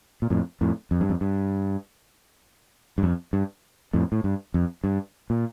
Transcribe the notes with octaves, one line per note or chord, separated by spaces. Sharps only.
A#2
F2 A2
F2 A2
F2
G2
F2
G2
G2
F2
G2
F2 A2
A2
G2
F2
G2
A#2